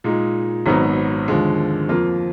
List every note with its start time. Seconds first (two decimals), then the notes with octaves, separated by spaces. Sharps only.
0.04 A#2 G#3 D#4
0.66 G#1 G#2 F#3 B3 D#4
1.28 D#2 D3 F3 G#3
1.89 F2 F3 A#3 F4